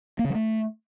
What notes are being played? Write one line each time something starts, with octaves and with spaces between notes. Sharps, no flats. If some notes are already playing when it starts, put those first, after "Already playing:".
A#3
C#3
F#3
A3